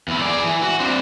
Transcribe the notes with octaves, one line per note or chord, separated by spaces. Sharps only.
E2 E4
G#4 D5
E3
F#4
C4 D4